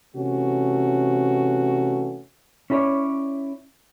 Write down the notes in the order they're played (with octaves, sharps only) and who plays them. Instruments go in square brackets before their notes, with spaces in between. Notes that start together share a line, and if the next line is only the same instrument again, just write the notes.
[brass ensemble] C3 E3 A3 C#4 F#4
[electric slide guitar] C#4 E4 A4 B4 C#5 D5